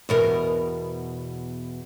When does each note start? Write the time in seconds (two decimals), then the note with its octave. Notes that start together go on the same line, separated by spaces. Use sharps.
0.09 E2 B2 A#4